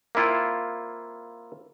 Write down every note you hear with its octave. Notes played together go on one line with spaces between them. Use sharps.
A#3 C4 E4 F4 G5